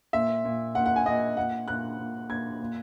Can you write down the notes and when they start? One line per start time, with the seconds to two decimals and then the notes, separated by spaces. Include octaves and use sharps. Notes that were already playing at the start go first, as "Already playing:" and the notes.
0.13 A#2 E5
0.45 A#2
0.75 A#2 F#5
0.86 F#5
0.96 G#5
1.06 A#2 D#5
1.37 A#2 F#5
1.67 A#2 F#6
1.98 A#2
2.29 A#2 G#6
2.60 A#2